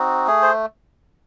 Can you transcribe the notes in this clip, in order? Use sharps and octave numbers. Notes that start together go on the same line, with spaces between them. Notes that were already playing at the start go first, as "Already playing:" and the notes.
Already playing: C4 D#4 F#4
A3 G#4
C5